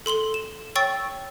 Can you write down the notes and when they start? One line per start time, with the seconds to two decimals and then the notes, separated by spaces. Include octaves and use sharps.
0.06 A4 C6 F#7 G7
0.34 E7
0.76 C#5 G5 C#6 E6 A6